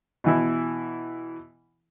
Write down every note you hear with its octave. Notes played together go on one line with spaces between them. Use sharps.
B2 E3 E4